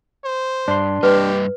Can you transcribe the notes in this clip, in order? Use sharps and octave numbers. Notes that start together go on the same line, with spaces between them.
C5
G2 D4 C6
G2 G3 G4 B4 D#5